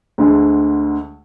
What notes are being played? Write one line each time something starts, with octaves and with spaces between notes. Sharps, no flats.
D2 D3 G#3